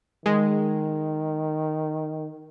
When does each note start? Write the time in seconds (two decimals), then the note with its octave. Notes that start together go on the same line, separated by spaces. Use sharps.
0.26 D#3 G#3